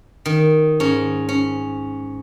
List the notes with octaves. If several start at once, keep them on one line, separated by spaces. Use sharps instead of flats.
D#3
G#2 C#4
C#4